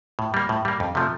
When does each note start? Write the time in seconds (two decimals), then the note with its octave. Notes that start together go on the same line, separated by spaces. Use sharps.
0.19 A2
0.34 G3 A#3
0.49 A2
0.65 G3 A#3
0.80 F2
0.95 C3 F3 A3